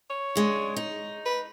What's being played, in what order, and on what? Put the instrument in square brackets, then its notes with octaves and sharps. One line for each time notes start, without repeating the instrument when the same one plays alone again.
[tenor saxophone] C#5
[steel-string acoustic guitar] C#3 G#3 D4
D#4
[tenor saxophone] B4